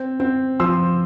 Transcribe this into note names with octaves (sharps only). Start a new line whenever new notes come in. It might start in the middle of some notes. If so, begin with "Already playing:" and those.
Already playing: C4
C4
F3 C6 E6